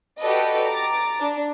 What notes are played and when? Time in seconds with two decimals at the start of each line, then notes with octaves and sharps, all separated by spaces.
0.21 F#4 G4 A4 B4 D5 D#5
0.65 A#5 D6 A6
1.20 D4